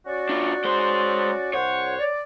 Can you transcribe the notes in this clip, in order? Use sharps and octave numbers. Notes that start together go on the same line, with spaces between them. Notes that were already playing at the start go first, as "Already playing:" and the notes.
C#4 F#4 D5
D4 F4
G#3 C5
C2 C5 C#5 F#5
D5